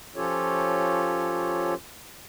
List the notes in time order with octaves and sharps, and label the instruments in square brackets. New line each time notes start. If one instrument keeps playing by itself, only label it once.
[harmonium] F3 C#4 F4 G4 A4 C#5